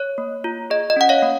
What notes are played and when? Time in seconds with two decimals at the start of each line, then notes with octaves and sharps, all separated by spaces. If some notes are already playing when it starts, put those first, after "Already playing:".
Already playing: C#5
0.18 A#3
0.44 F4
0.70 G#4 D#5
0.90 D#5
0.96 C#4 F#5
1.09 C#5 F5
1.22 A#3